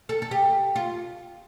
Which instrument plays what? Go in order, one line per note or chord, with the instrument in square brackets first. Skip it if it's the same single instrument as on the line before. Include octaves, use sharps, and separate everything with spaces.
[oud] A4
A4
G4
F4